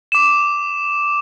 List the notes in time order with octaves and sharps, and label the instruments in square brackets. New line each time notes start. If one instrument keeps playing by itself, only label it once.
[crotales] D6 E7